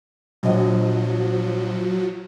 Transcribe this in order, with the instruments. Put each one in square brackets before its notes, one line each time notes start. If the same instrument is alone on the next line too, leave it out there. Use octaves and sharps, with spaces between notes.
[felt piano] A#1 D#5 [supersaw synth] F3 F#3